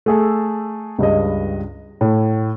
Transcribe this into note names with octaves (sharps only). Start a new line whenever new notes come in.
A3 G#4 A4
C#2 G2 D#5
A2